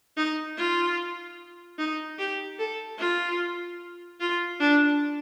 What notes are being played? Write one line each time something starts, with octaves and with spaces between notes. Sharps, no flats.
D#4
F4
D#4
G4
A4
F4
F4
D4